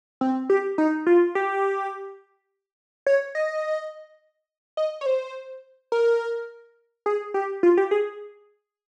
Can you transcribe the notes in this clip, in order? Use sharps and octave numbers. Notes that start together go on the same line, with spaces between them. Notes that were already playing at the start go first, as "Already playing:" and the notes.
C4
G4
D#4
F4
G4
C#5
D#5
D#5
C#5
C5
A#4
G#4
G4
F4
G4
G#4